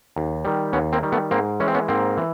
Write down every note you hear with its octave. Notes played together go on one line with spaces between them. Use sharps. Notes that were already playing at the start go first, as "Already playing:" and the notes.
D#2
D#3 G3
D#2 B3 C#4
A#3 C4
D#3 G3
A3 B3
G#2 A#3 C4
E3 G#3 C#4
C4
B3 C#4
G#2 A#3 C4
E3